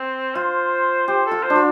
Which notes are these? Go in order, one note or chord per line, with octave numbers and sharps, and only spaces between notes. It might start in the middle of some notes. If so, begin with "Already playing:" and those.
Already playing: C4
F4 C5
G4 C5
A4
F4
C5
D4
F4